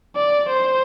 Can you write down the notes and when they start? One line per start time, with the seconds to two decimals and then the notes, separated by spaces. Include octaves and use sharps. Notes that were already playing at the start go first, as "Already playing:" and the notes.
0.16 D5
0.49 C5